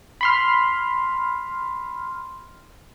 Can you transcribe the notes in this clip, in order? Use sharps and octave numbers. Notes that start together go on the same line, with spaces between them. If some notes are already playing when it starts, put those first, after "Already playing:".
B5 C6 F6